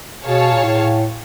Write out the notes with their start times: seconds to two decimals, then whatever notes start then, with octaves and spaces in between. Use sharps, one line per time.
0.23 B2 G#4 C#5 F5 A5
0.52 A#2
0.63 A2